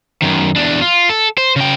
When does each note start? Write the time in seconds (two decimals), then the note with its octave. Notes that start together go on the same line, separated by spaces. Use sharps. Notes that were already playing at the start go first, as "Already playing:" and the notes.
0.22 F#2 D#3
0.56 E2 D4
0.82 F4
1.10 A4
1.38 C5
1.56 C#3 G5